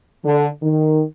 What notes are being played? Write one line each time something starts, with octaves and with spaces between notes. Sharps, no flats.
D3
D#3